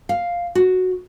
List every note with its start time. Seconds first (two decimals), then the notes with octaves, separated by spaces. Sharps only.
0.09 F5
0.55 F#4